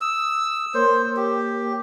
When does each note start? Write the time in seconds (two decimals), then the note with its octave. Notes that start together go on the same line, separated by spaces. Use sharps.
0.01 D#6 E6
0.74 A#3 A#4 C5 C#5
1.17 G4